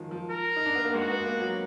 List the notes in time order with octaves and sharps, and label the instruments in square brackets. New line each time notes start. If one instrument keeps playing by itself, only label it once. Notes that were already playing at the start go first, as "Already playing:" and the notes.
Already playing: [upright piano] D#3 F3 F#3 G#3
F3
[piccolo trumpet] A#4
[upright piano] D#4
D4
B3
A#3
[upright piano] G#3 [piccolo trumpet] F#4
[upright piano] B3
A#3
F#3